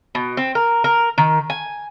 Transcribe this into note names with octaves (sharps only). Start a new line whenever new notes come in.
B2
C4
A#4
A#4
D#3
G#5